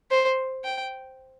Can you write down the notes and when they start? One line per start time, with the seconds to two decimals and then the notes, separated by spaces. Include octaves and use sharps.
0.11 C5
0.64 G5